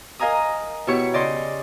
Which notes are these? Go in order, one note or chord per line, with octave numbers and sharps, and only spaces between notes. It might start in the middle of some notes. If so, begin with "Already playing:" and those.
A#4 D#5 F5 G#5 A#5 D#6
B2 E4 G4 C#5 C#6
C#3 D5 D#5 C6